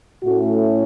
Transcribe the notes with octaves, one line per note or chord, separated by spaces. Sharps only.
A2 A3 C#4 F#4